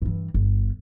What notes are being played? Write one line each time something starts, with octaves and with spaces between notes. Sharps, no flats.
G2 E3
G1